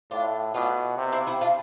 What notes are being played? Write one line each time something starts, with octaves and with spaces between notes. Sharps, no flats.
A2 D4 F4
B2 D4 F4
C3
C4 E4
C4 E4
D4 F4